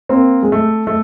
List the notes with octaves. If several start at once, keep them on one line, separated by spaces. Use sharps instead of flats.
A#3 C4
G#3
A3
A3